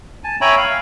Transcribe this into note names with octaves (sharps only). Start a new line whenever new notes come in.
G#5 A5
C#5 E5 G5 G#5 A#5 B5
F5